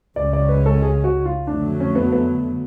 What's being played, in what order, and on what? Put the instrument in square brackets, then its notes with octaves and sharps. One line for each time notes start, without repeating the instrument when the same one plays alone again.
[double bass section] C#2 C#3 G#3 C#4 [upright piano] D5
[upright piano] D5
B4
A4
G#4
F#4
F4
[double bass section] F2 D3 F#3 A3 [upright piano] D4
[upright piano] C#4
B3
B3